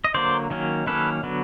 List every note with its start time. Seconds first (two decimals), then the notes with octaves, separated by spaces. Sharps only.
0.04 D#5
0.14 D3 F#3 A#3 C5 D5
0.50 D#3 F#3 A#3 C#4
0.87 D#3 F#3 A#3 C#4 A4 B4
1.23 D3 F#3 B3